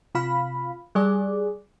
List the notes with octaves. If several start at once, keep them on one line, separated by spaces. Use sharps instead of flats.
C3 F4 F5 B5
G3 G#4 D5